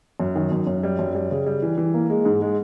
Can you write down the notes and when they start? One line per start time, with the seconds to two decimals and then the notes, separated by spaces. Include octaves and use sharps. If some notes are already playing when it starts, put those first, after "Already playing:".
0.20 F#2
0.36 D#3
0.51 F#2
0.67 F#2
0.83 G3
0.99 F#2
1.15 G3
1.31 C#3
1.46 G3
1.62 E3
1.78 E3
1.94 A#3
2.10 G#3
2.25 G#2
2.42 G#3